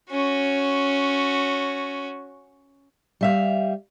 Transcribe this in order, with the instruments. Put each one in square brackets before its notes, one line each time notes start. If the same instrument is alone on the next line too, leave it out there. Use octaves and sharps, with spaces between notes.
[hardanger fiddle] C#4 F#4
[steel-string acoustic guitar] G3 E5 F5